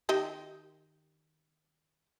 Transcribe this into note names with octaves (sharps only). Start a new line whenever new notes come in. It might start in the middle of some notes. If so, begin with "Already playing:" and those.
D#3 G4 D#5